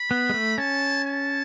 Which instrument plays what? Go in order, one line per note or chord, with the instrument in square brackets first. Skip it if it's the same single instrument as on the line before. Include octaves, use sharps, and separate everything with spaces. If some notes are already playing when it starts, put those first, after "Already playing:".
Already playing: [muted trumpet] B5
[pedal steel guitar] B3
G#3
A3
[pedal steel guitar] C#4 [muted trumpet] A5
[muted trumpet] A5